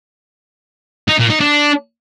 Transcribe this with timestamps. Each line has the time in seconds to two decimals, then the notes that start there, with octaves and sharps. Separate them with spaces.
1.09 D#4
1.19 A#2
1.30 D#4
1.41 D4